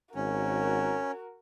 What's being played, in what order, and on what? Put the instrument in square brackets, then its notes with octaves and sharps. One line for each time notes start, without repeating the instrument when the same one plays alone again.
[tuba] G#1 [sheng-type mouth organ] C#4 [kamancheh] F#4 A#4